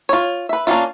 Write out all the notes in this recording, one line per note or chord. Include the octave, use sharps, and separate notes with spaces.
F4 C#5
B4 E5
A#3 C#4 D4 E4 F4